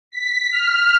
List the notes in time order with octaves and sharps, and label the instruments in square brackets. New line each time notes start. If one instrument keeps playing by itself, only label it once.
[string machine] B6
F6